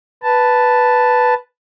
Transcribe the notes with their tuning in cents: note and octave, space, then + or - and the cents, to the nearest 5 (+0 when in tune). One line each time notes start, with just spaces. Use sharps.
B4 +0 A5 +0